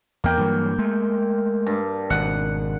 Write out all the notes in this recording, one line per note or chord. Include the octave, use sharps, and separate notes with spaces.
E2 A#3 G5
G2 E3 F#3
G#3 A3
G2
G#1 B2 F#5